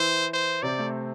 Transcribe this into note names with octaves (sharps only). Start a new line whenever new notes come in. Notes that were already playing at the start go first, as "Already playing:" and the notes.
Already playing: E3 E4 C5
C5
C3 C4 D5
A3